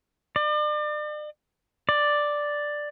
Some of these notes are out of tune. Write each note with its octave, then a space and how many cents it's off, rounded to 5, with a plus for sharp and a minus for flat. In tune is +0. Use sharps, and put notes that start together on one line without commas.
D5 +40
D5 +5